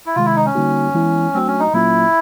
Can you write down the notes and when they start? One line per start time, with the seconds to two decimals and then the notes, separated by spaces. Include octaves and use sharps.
0.06 E4
0.16 C3 D#3 G#3 F4
0.26 E4
0.36 D#4
0.45 C#4
0.55 D3 G3 A#3 D#4 F#4
0.94 E3 G#3 B3 E4
1.34 F#3 A3 C4 D4 F#4
1.47 C#4
1.60 D#4
1.73 A#2 F#3 A#3 C#4 E4 F4